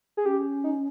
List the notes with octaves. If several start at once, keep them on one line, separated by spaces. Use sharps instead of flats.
G#4
C#4 G4
D#4